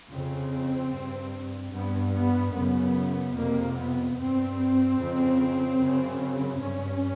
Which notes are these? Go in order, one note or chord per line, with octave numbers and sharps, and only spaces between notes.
F2 C#3 C4
G2
G2 B3
B3
F#2 C#3 B3
F2 C3 A#3
B3
G2 C4
F2 C#3
F#2 C#3
G2 C#4